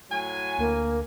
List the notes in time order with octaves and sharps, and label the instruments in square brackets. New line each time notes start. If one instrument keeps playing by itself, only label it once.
[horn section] A2 F#3 G#5
[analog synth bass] D2 [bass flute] A#3